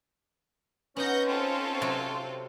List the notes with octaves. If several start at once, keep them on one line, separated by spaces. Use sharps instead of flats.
B3 C#4 D#4 F#5 G6 A#6
C4 F4 A4
C3 F#3 G#5